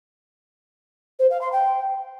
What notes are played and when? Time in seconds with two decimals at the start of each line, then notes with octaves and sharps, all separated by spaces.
1.19 C5
1.30 F5
1.41 C6
1.52 G5